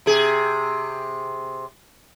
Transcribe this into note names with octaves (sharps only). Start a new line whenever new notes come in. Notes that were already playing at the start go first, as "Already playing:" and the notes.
C3 G#4